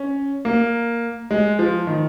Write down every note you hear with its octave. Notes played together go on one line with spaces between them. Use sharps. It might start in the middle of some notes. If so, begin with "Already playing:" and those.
Already playing: C#4
A#3
G#3
F3
D#3